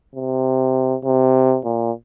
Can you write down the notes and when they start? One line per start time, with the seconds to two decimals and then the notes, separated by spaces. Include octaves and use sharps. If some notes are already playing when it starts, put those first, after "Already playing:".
0.14 C3
1.05 C3
1.65 A#2